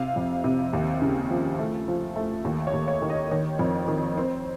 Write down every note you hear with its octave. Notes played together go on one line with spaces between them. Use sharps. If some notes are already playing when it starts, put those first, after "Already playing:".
Already playing: C3 F5
F2
C3
D#2
C#3
F3
A3
F3
A3
D#2
C#5
D#2
C#5
D#3
D#5
D#3 C#5
F2
D#3
C4